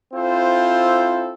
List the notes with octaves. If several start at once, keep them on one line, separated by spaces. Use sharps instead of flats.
C4 E4 F4 A4 C5